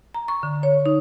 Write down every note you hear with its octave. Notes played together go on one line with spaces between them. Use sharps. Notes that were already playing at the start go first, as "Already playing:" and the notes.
A#5
C#6
D3
C#5
D#4